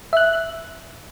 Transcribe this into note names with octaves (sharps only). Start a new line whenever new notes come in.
E5 F#6